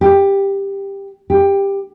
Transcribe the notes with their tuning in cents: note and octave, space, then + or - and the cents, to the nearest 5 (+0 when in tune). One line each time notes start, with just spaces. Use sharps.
G4 +10
G4 +15